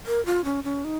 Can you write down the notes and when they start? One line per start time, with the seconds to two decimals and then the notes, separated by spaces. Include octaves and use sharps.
0.06 A#4
0.26 F4
0.44 C#4
0.64 C#4
0.85 D#4